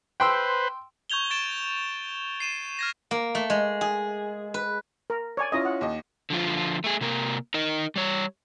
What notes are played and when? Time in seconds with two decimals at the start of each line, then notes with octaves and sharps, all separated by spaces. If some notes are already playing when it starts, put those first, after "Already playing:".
0.20 B4 C5 G5 C6 E6
1.10 C#6 G6 G#6 F7 G7
1.30 C#6 A6 D7 E7
2.40 C7 D#7 E7
2.79 F6 G#6 A#6
3.11 A#3
3.35 A3
3.50 G#3
3.81 G#4
4.54 B4
5.10 A#4
5.37 C#5 D5 G#5
5.52 C#4 E4 F4 D#5
5.65 F#5
5.81 D#2 D#5
6.30 D3 F3 F4
6.84 A3 G#4
7.01 C3 A#3 A#4
7.54 D#4 A#4 D#5
7.96 G3 C#5